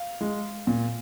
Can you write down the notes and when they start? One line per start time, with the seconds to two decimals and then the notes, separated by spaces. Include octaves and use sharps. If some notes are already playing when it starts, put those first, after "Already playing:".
Already playing: F5
0.21 G#3
0.67 A#2